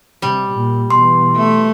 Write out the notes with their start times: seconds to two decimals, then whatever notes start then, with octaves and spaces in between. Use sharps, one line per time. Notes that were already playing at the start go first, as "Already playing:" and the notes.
0.22 C3 G3
0.52 A#2
0.90 B2 E3 C6
1.36 A3